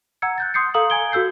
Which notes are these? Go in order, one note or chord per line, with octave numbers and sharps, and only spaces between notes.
F#5 A#5 E6 G#6 C#7
F#6 G6 A6
C6 D#6 G6 C7 C#7
A4 F5 A#5 D#6 E6 F#7
G#5 A#5 G#6 D7 G7
F#4 A4 E6 G6 C7